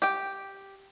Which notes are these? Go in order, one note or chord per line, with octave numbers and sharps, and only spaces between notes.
G4 G5